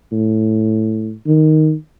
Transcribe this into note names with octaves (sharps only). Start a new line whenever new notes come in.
A2
D#3